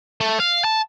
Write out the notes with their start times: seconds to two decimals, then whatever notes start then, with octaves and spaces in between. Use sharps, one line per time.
0.21 A3
0.40 F5
0.65 A5